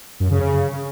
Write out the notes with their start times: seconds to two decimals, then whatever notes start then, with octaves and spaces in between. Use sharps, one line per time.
0.20 F#2
0.30 C#3
0.40 C#3